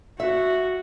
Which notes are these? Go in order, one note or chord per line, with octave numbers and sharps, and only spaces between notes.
F#4 E5